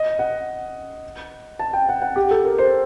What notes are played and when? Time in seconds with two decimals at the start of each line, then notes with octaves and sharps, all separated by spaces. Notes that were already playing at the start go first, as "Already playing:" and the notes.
Already playing: D#5
0.19 F#5
1.59 A5
1.73 G5
1.89 F#5
2.02 F#5
2.16 G4
2.31 A4
2.45 A#4
2.59 C5